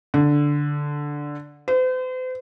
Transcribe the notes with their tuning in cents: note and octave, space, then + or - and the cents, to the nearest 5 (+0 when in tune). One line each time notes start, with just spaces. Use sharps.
D3 -5
C5 -40